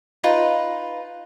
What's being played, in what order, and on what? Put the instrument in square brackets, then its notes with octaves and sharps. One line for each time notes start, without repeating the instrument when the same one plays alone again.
[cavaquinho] D#4 F4 B4 A#5